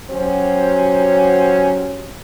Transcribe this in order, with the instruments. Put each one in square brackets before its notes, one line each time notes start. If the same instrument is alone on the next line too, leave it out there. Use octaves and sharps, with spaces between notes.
[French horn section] F#3 C#4 F#4 G4 C5